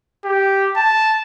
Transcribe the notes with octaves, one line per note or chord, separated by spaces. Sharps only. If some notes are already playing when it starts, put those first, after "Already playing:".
G4
A5